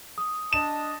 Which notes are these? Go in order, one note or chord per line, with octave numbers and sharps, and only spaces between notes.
D#6
D4 D#5 A5 E7